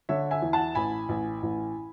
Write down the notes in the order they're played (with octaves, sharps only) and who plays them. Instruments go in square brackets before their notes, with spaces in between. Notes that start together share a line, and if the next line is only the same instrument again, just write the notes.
[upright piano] D3 C#5 E5
E5 G#5
E2
F#5 A5
A1 G#5 B5
A1
A1